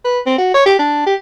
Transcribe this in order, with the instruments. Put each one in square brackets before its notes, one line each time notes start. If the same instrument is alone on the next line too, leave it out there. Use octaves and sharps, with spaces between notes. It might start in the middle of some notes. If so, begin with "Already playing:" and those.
[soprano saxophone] B4
C4
F#4
C#5
G4
D4
G4